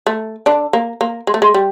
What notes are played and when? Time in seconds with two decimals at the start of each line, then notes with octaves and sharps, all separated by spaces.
0.07 A3
0.46 D3 D4
0.73 A#3
1.01 A#3
1.27 G#3
1.34 A3
1.42 G#3
1.54 G3